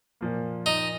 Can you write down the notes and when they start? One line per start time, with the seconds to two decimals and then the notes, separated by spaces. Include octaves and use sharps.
0.21 A#2 F3 A#3
0.66 D#4